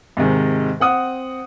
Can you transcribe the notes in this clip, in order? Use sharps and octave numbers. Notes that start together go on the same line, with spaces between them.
G#2 C3 D#3 G#3
C4 F#5 D#6